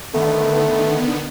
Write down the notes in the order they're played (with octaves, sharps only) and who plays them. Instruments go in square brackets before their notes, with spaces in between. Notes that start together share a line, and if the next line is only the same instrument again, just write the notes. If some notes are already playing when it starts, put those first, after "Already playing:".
[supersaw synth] D3 D#3 B3 [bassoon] A3